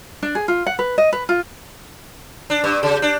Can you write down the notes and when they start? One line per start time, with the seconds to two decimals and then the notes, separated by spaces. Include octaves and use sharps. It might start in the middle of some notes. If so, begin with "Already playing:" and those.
0.23 D4
0.35 G#4
0.48 F4
0.67 F#5
0.79 B4
0.98 D#5
1.13 B4
1.29 F4
2.50 D4
2.64 G2
2.83 C#3
3.02 D4